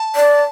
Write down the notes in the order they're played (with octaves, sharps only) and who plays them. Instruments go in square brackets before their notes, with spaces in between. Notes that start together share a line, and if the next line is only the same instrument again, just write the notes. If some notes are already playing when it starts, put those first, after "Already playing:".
Already playing: [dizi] A5
[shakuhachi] D5